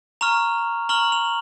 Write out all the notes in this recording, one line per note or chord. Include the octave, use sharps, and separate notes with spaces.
A#5 C#6 F6 F7
A#5 C#6 F6 F#7
F7